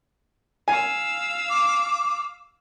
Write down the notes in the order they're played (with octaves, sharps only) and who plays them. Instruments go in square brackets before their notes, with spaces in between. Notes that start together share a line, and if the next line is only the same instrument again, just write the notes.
[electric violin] F5 E6 [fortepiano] G#5
[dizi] D6